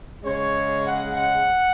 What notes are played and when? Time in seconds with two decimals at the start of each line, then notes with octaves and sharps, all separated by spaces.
0.23 C#3 G#3 C#5
0.85 F#5
1.16 F#5